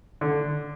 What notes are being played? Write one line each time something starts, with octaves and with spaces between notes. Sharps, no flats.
D3